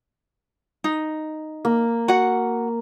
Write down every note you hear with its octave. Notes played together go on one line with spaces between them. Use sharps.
D#4
A#3
F#4 F#5